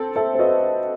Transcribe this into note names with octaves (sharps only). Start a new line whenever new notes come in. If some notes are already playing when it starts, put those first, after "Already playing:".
Already playing: C4 A4
A4 C5 E5
C5
F#4 B4 D#5